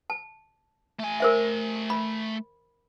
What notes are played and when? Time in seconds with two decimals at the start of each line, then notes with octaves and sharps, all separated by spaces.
0.10 A5
1.00 A3 G#5
1.20 A#4 C5 E5
1.90 B5